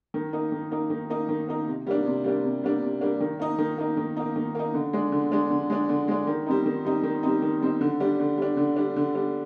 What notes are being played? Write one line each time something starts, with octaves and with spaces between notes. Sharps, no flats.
D#3
A#3 D#4
D#3
A#3 D#4
D#3
A#3 D#4
D#3
A#3 D#4
C3
G3 A#3 D4
C3
G3 A#3 D4
C3
G3 A#3 D4
C3
G3 A#3 D4
D#3
A#3 D#4
D#3
A#3 D#4
D#3
A#3 D#4
D#3
A#3 D#4
D3
G#3 D4
D3
G#3 D4
D3
G#3 D4
D3
G#3 D4
D#3
G3 C4 D#4
D#3
G3 C4 D#4
D#3
G3 C4 D#4
D#3
G3 C4 D#4
D3
G3 D4
D3
G3 D4
D3
G3 D4
D3
G3 D4